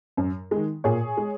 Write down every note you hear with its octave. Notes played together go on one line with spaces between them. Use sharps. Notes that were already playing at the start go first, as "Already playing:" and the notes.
F#2
D#3 G#3
A#2 G#4 C#5
G#3